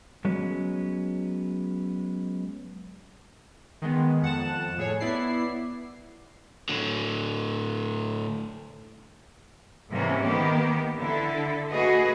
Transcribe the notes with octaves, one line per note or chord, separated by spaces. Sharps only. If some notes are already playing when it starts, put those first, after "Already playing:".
F#3 G#3 B3 C#4
D#3 G#3 B3
F2 F#5 A5 E7
A2 G#4 C#5
B3 E4 D5 C7
A2 D3
G#2 C3 E3 A#3 C#4
D#3 A#3 B3 G4
D3 E4 A4
A3 F#4 G#4 B4 D#5